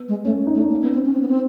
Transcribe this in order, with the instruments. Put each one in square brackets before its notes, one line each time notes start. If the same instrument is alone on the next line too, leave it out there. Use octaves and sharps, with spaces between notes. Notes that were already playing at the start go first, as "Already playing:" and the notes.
Already playing: [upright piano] B3
[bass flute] G#3
[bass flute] A3 [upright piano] C#4
[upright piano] D#4
[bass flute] A3
[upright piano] D4
[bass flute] A#3 [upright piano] C#4
[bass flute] B3
C4
C#4
C4
B3
C4